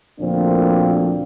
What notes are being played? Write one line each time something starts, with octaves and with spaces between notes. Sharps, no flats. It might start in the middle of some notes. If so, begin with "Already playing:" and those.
D2 A#2 F3 A#3 C4 D4